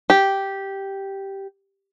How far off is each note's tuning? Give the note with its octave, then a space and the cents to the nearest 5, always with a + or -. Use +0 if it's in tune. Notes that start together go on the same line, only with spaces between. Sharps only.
G4 -5